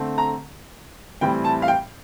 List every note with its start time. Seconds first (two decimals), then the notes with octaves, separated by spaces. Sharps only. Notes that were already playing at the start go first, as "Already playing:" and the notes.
Already playing: D3 A3 C4
0.18 A#5
1.21 A2 E3 G3 C4 G5
1.44 A5
1.62 F5
1.68 G5